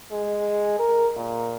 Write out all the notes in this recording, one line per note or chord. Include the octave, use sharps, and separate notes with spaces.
G#3
A#4
A#2